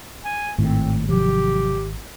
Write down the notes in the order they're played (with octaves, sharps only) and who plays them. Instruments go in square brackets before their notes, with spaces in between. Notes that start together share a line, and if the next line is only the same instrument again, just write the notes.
[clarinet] G#5
[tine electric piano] G#1 [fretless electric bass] A2 [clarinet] C4
[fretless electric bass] C3 F3 F#3 [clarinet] G4